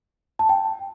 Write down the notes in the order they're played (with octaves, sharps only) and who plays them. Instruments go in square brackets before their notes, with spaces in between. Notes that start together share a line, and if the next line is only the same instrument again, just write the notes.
[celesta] A5
G5